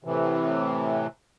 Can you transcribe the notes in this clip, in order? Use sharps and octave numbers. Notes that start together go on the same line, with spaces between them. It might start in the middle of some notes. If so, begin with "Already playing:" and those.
A2 C3 E3